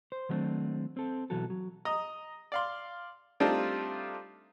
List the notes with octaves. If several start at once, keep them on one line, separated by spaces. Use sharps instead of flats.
C5
D#3 F#3 G3 A3 C4 D4
C4 A4
B2 E3 F#3 F#4 A4
F#3
D#5 A#5 D#6
D5 F5 C6
G3 A3 C4 D4 D#4 F4